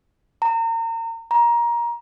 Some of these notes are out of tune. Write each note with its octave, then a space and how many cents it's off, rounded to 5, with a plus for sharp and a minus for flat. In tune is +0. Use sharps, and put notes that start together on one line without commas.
A#5 -35
A#5 +20